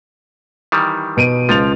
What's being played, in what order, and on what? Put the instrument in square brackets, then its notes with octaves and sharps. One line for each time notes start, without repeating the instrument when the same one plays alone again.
[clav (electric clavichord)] D#3 E3 G3
[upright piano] B2 D7 D#7
[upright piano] C#2 A6 F7 [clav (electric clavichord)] F3